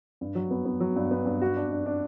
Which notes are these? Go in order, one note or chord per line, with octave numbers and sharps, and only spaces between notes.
G2
F#3
B3
B3
F#3
G2
B3
G2
F#4
D4
D4
D4